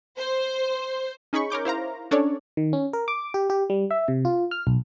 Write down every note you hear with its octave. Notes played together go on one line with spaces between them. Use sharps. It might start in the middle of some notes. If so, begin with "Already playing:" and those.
C5
C#4 D#4 G#4 B5 C#6
A#4 C#5 D6 G6
E4 C5 F5 A#5
C#4 D4 A4 C#5 D5
D#3
C#4
A#4
D6
G4
G4
G3
E5
C3
F4
F6
B1